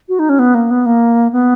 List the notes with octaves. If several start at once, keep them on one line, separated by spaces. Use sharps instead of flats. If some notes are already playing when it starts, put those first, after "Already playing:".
F#4
D#4
C#4
B3
A#3
B3
A#3
B3